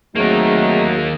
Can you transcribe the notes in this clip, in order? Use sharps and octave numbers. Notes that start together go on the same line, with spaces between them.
D#3 F#3 A3 A#3 C4 D#4 G#4